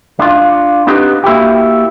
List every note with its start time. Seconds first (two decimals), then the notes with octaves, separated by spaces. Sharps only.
0.19 D4 F4
0.87 B3 C4 D4 D#4 G4 B4
1.24 A#3 E4 F#4 G4